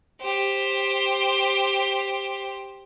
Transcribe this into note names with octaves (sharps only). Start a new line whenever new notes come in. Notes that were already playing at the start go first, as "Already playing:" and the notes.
G4 C5